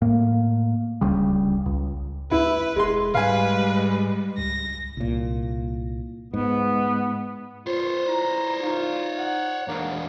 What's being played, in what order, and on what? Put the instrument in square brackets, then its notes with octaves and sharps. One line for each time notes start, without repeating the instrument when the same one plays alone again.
[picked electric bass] A2 A#3
D1 C#2 C#3 G3
C#2
[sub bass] D2 [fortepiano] E4 [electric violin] B4
[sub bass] E1 [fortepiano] G#3 C6
[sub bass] G#2 [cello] G3 G#3 [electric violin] B4 [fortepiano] F5 G#5
[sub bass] C#2 [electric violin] A#6
[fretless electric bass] C2 A#2
[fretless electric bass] G#2 [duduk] B3
[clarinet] F4 [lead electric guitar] C5 C#5
[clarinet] E4 [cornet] A#5
[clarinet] D#4 [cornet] F4
[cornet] F#5
[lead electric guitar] E2 D4 [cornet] A#3